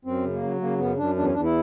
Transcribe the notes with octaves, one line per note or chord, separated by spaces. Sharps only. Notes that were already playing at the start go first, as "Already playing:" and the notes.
F#2 C4
C#3
A#3
F#3
C#3 A#3
F#2 B3
F#2 D4
E2 D4
C#4
E2 D4
E4